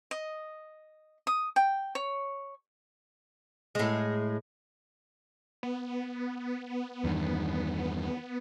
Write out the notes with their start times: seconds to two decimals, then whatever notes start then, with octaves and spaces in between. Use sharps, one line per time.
0.11 D#5
1.27 D#6
1.56 G5
1.95 C#5
3.75 A2 G#3
5.63 B3
7.04 E2 G2 D#3